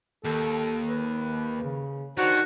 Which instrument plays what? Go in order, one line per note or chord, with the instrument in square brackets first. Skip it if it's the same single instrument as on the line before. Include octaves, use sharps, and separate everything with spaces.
[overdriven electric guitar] D#2 [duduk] A4
[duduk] B4
C#3
[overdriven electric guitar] D#3 [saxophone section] D4 F#4 [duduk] C5